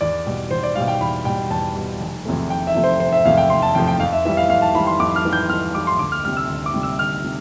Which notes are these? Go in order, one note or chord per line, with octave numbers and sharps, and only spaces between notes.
E2 D5
B2 G3
E2 C5
D5
B2 G3 F5
G5
E2 B5
B2 G3 G5
E2 A5
B2 G3
F1
E2 C3 F3 A3
F1 G5
E5
E2 C3 F3 A3
C5
F1 C5
E5
E2 C3 F3 A3 F5
G5
F1 C6
A5
E2 C3 F3 A3 G5
G5
F2 F5
E5
E3 G3 E5
F5
F2 F5
A5
E3 G3 B5
C6
F2 D6
F6
E3 G3
G6
F2 F6
E3 G3 D6
C6
D2 D6
F6
C3 G3 F6
E6
D2
D6
C3 G3
E6
D2 F6
C3